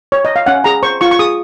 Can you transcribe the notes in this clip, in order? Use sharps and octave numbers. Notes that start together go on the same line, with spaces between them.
C#5
D#5
F5
C#4 F#5
G#4 A#5
C5 C#6
F4 C#6
C#6
G#4 D#6